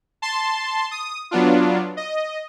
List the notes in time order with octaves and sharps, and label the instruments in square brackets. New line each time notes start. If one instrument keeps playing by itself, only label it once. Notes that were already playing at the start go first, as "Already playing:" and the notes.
[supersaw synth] A5 C6
D#6
F#3 B3 D4 F4
D#5